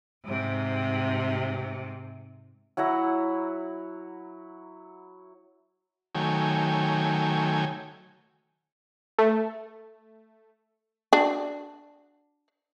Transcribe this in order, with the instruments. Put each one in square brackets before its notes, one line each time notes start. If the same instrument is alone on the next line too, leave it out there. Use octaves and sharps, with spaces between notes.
[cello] G#2 C3
[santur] F#3 E4 F#5 A#5
[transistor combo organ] D#3 F#3 A3 C#5 G5 G#5
[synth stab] A3
[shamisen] D4 F#4